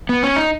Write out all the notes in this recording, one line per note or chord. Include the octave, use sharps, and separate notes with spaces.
B3
C#4
D#4